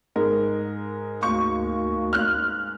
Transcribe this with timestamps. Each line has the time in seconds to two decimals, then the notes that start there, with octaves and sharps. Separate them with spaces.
0.16 G#2 G#3 A#4
1.23 D2 A#3 F#4 C#6
2.13 F6 F#6